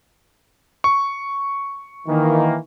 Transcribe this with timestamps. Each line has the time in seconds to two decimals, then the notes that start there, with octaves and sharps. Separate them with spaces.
0.84 C#6
2.08 D#3 E3 A#3